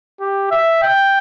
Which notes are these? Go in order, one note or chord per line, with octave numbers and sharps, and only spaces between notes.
G4
E5
G5